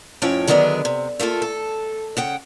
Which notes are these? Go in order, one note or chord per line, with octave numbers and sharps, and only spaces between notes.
F2 A2 F3 C#4 C#5 G5
D3 D#3 F#3 B3 D4 G#4
C3
A3 A#3 F4 A4
A4
C#3 F#5 G5